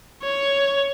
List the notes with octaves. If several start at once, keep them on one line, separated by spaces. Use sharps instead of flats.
C#5